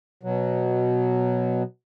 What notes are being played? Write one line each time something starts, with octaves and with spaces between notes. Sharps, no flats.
B2 F#3